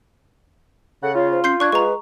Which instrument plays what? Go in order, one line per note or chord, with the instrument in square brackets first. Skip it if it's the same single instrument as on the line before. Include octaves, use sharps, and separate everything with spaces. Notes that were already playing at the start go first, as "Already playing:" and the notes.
[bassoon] C#3 [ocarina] A4 [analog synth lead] F#5
[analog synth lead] F4 [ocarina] C#5
[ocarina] C5
[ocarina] C#4 [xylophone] C6 G6 C7
[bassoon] D4 [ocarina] D5 [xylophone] C#6 F#6 G#6
[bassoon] G#3 [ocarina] B4 [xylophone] A#5 C#6